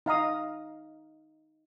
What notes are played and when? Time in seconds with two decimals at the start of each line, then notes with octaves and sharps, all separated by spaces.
0.06 D#4 F5 A#5 D#6